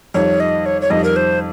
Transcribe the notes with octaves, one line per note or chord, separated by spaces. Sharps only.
F2 D#3 G3 C#5
D#5
C#5
C#5
F2 D#3 G3 D#5
A#4
C5